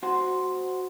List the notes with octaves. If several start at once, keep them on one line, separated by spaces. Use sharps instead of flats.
F#4 C5